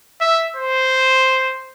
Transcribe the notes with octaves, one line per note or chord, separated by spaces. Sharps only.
E5
C5